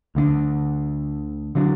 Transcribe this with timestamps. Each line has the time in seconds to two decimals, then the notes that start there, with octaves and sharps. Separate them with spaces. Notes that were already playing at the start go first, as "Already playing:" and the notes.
0.15 D2 D3 B3 D4
1.55 D3 F#3 D4